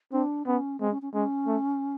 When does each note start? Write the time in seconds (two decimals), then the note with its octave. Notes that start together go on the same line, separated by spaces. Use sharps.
0.12 C4 D4
0.47 B3 C#4
0.80 G#3 C4
0.91 C#4
1.02 C#4
1.13 G#3 C#4
1.46 A3